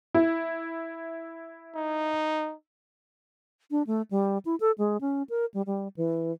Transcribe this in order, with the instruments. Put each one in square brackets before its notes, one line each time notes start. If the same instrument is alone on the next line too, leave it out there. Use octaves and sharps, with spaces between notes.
[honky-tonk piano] E4
[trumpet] D#4
[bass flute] D4
A3
G3
E4
A4
G#3
C#4
A#4
G3
G3
E3